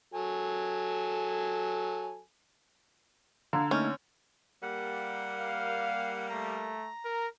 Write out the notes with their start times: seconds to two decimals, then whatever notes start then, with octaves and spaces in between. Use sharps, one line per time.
0.14 F#3 A4 G#5
3.53 D3 F5 A#5 G#6
3.71 A3 A#3 C#4 D#4 C#6 F6 G6
4.62 G3 A#3 F#5
5.39 F5
6.30 A3 A#5
7.05 A#4